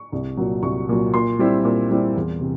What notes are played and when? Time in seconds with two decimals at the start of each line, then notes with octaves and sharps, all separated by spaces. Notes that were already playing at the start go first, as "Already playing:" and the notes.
Already playing: C#6
0.12 C2
0.37 A#2 F#3
0.63 C2 C#6
0.89 A#2 F#3
1.14 A#2 C6
1.39 G3 C4 E4
1.65 A#2
1.91 G3 C4 E4
2.16 E2
2.41 C3